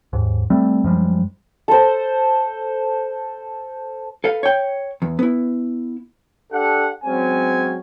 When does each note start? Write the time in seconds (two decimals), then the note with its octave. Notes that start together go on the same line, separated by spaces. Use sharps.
0.13 D#2 G#2
0.50 G3 A3 C4
0.84 F#2 F3 G3 G#3
1.68 A4 C5
4.24 A4 B4 F5
4.43 C#5 G5
5.02 E2
5.19 B3 E4
6.52 D4 G4 A4 F#5
7.04 F#3 G#3 C4 C#4 G#5